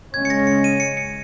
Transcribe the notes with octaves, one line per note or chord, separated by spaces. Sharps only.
C#3 G#3 C#4 G#6
C#7
A#6
C#7
D#7
C#7
C#7